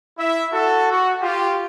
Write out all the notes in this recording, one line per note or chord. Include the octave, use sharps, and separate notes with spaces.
E4 E5
F#4 A4
F#4
F4 G4